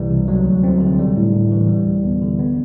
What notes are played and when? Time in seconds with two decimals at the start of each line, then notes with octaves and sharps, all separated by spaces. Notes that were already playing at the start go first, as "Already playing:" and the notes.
Already playing: C2 E3 G3
0.11 C3
0.28 F#3
0.45 D2
0.64 C4
0.80 D3
0.99 G3
1.16 A2
1.33 A2
1.51 E3
1.68 G3
1.86 D2
2.04 B3
2.22 D3
2.39 B3